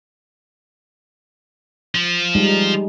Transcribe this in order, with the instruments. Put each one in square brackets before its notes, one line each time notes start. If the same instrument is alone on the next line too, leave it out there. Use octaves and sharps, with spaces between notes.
[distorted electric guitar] F3
[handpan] G3 G#3 D#4